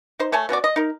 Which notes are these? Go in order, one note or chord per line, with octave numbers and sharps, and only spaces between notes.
D#4 C5
A3 C#5 G#5 A5
B2 C#4 F#4 D5
D#5
D#4 A#4